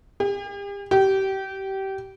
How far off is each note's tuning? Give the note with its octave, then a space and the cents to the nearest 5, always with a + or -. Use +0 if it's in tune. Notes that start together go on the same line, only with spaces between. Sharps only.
G4 +45
G4 -25